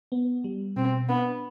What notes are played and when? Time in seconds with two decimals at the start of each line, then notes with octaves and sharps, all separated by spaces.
0.12 B3
0.44 G3
0.76 B2 C4
1.09 B3 D4